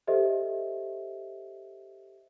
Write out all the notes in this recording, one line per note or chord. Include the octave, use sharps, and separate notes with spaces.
G4 A4 C5 D#5 E5